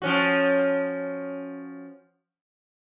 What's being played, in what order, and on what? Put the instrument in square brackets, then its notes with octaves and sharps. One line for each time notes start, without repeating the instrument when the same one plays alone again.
[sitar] F3 C#4 F#4